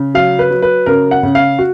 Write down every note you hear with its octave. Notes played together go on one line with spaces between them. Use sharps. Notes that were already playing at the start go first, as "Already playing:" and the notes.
Already playing: C#3
F#3 F5
B4
F#3
B4
C#3 A#4
F#5
C#3
F5
F#4